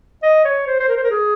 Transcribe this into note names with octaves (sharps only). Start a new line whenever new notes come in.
D#5
C#5
C5
C5
A#4
C5
A#4
G#4